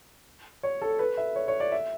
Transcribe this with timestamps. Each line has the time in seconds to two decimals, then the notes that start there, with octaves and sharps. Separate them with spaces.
0.63 C#5
0.82 A4
0.99 B4
1.17 E5
1.36 C#5
1.48 C#5
1.60 D5
1.72 E5